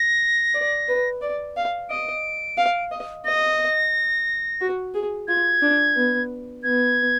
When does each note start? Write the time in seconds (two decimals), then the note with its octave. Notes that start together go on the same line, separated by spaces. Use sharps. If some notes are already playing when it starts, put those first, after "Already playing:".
Already playing: A#6
0.54 D5
0.88 B4
1.22 D5
1.57 F5
1.90 D#5 D7
2.57 F5
2.92 D#5
3.25 D#5 A#6
4.61 F#4
4.94 G#4
5.28 F4 G#6
5.62 D4
5.96 B3
6.63 B3 G#6